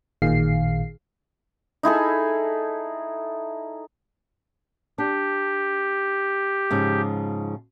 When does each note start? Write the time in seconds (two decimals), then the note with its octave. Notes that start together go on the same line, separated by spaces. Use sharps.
0.22 A1 A#2 D#3 G#4 F5 C7
1.83 D#4 E4 G#4 A4
4.98 D4 G4
6.71 G#2 C#3 F3